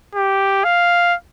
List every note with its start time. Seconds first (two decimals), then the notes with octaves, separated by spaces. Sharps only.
0.15 G4
0.64 F5